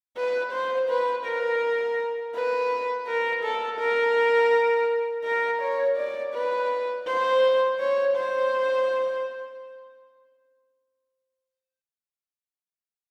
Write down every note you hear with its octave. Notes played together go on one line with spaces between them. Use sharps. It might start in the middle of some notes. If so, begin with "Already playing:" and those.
B4
C5
B4
A#4
B4
A#4
A4
A#4
A#4
C#5
D5
B4
C5
C#5
C5